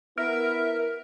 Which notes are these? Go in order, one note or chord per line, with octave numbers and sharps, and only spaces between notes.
B3 E4 A#4 E5